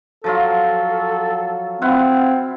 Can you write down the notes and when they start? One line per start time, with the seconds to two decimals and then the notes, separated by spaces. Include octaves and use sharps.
0.24 F3 F#3 F4 A4
1.82 C4 E4 F4 F#5